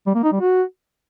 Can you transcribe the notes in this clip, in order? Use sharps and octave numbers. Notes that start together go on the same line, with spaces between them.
G3
A#3
D#4
G3
F#4